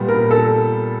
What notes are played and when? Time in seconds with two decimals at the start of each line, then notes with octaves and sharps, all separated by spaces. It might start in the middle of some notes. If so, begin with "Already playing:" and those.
Already playing: A#2 G3 B3
0.08 A#4
0.31 A4